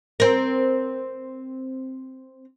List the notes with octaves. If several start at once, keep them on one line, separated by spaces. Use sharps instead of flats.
C4 A#4